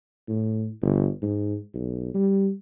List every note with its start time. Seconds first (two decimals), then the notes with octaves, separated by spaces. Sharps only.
0.28 A2
0.82 G1
1.22 G#2
1.74 B1
2.14 G3